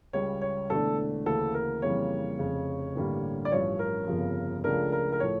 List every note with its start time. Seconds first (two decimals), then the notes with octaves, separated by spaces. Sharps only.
0.13 C#2 C#3 G3 C#4 C#5
0.41 C#5
0.70 E1 E2 D3 A3 D4 A4
1.26 D2 C#3 E3 A#3 A4
1.54 A#4
1.82 F2 C#3 E3 G3 A#3 C#5
2.39 F1 F2 C#3
2.95 A1 G2 D3 G3 A#3
3.45 D5
3.51 A1 G2 F3 C#4 C#5
3.79 A#4
4.07 G1 F2 C#3 F3
4.64 C#2 C#3 F3 A3 D4 A#4
4.92 A#4
5.12 A#4
5.20 A2 F3 A3 C#5